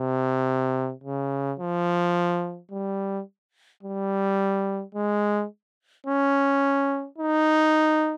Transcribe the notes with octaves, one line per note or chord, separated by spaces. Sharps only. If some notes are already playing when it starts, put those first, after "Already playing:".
Already playing: C3
C#3
F3
G3
G3
G#3
C#4
D#4